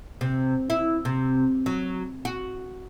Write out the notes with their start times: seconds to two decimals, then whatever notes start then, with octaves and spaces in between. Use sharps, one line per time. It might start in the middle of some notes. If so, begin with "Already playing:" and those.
0.21 C3
0.70 E4
1.05 C3
1.66 F#3
2.25 F#4